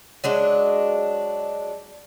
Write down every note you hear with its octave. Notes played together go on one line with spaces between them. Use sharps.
F#3 G#3 D4